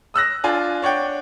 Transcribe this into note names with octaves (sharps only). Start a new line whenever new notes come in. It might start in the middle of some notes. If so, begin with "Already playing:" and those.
D#6 E6 F#6 A#6
D4 F4 G#5
D4 C#5 F#5 G5